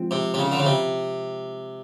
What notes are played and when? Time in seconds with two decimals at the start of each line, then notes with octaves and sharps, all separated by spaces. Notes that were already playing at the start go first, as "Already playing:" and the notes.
Already playing: F3 G#3 C4
0.11 C3
0.34 C3
0.39 C#3
0.52 D3
0.59 C#3
0.66 C3